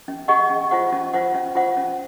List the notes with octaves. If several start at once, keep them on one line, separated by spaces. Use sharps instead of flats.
C#4
G#4 D#5 F#5 C#6
C#4
F4 C5 F#5
C#4
F4 C5 F#5
C#4
F4 C5 F#5
C#4